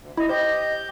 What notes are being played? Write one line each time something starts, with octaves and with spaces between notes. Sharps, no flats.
D2
F#2 D#3 E4 D#5
G4 C5 D#5 G6